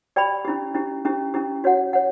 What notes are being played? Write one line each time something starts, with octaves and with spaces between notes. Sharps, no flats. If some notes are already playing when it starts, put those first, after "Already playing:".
G4 D5 G5 B5
C#4 E4 G4
C#4 E4 G4
C#4 E4 G4
C#4 E4 G4
F#4 C#5 F#5
C#5 F#5